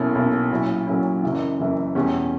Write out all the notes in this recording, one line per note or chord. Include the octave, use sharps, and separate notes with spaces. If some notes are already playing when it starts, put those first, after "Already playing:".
Already playing: B1 B2 A#3 C#4 E4
B1 B2 A#3 C#4 E4
A#2 F#3 C#4 E4
A#2 F#3 C#4 E4
F#1 F#2 E3
F#1 F#2 E3
E2 B2 G3 C#4